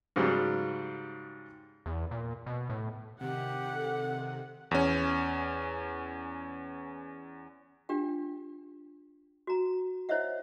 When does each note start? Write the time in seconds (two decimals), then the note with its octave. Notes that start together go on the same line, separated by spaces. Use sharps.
0.16 G#2 C#3 F#3 G3
1.86 E2
2.11 A#2
2.46 B2
2.70 A2
3.21 C3 D#3 G4 F#5
3.74 A4
4.71 E2 C#4
7.89 D4 F4 G4 G5
9.47 F#4 A#5
10.09 E4 C5 C#5 D#5 E5 F#5